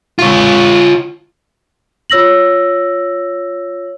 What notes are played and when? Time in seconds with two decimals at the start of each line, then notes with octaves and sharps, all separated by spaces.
0.19 F4 C#5
2.10 F4 C#5 E6 A#6 F#7